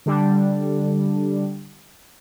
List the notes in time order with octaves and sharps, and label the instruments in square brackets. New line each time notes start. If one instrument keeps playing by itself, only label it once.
[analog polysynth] D3 G3 D4